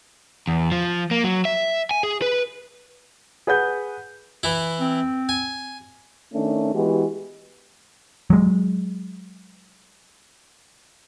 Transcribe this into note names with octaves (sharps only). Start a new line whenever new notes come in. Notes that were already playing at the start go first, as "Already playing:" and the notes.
E2
F3
A#3
F#3
E5
G#5
G#4
B4
G#4 B4 F#5 G6
E3 E4
C4
G#5
D#3 A3 C#4 D4
E3 G#3 B3 F#4 G4
F#3 G#3